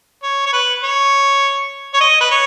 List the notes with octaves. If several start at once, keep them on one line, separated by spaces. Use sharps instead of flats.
C#5
C#5
B4
C#5
C#5
D#5
B4
C#5